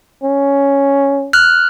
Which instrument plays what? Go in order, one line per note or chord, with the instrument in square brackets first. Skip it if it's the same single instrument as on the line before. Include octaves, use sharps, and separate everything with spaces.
[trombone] C#4
[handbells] F6 F#6